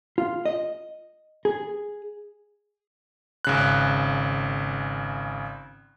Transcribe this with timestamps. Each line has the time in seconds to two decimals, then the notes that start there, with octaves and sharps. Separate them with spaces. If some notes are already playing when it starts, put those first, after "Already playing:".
0.18 F4
0.46 D#5
1.45 G#4
3.45 G#1 C#3 F#6